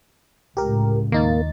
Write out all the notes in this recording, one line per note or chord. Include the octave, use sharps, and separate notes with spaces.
C#2 A2 G4 A#4
D#2 A#3 D#4 A6